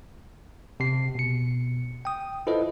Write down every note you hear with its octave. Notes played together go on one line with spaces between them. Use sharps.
C3 C7
B2 C#7
G5 D#6
E4 F4 A4 B4 C5 D#5